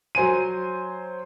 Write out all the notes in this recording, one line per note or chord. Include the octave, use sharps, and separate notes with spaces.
F#3 C5 G#5 D#7